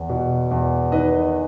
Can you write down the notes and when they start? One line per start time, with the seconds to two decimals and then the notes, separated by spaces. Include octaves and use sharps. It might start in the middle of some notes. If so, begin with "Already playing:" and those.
Already playing: E2
0.09 B2
0.51 E2
0.92 D#3 B4 D#5